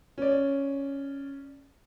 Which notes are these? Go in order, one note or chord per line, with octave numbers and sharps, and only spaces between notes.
C#4 D5